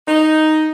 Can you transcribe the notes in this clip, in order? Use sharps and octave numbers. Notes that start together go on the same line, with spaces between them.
D#4